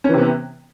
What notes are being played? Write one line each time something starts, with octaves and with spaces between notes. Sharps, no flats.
C3 E3 B3 C#4